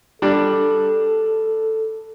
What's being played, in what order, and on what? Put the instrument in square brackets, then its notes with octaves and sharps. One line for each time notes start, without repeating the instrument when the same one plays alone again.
[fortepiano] G3 D4 [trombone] A4